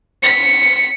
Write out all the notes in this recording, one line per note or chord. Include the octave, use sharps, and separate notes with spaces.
B6 C#7